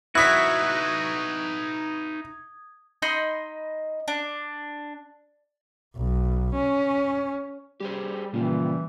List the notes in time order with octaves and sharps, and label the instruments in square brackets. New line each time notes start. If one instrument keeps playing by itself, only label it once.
[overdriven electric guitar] D#4 B4 [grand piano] E4 B6 [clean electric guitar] F#4 [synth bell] D#6 G#6
[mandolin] D#4 D#5 B5 C6
D4
[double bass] B1
C#4
[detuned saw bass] G3 [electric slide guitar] G4 G#4 C5
[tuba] A#2 [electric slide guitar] C#3 F3 [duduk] E3